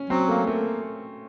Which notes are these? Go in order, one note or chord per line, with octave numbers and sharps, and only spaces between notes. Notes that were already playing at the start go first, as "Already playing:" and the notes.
Already playing: C#4
F#3 C4
A3 A#3
A3 A#3